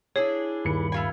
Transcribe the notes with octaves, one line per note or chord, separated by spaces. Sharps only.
D4 E4 G#4 C#5
D#1 G2 B5 C#7
E4 F4 G#5